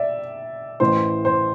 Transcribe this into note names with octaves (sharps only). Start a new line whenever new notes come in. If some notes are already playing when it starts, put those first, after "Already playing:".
Already playing: D5 E5
A1 A2 E3 C5
C5